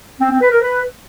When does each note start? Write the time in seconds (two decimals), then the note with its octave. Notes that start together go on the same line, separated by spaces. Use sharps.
0.21 C4
0.31 C4
0.41 B4
0.51 A#4
0.61 B4